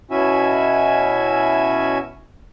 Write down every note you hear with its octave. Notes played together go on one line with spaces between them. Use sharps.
B2 C#4 E4 F#4 E5 G#5